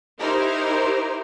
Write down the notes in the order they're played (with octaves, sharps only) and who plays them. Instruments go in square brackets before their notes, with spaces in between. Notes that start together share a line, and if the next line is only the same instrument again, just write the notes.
[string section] D#4 E4 G4 A#4 C5